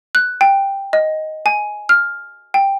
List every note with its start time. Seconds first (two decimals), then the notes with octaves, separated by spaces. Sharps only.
0.15 F#6
0.41 G5
0.93 D#5
1.46 G#5
1.89 F6
2.54 G5